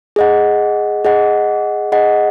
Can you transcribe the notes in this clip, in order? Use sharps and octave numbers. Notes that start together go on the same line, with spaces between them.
G#4 D#5 F#5
G#4 D#5 F#5
G#4 D#5 F#5